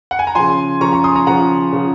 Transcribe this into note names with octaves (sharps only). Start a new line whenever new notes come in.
F#5
G#5
A#5
C#3 F3 G#5 C6
C#3 F3 A#5 C#6
A#5 C#6
C6 D#6
A#5 C#6
C#3 F3 F#5 A#5
C#3 F3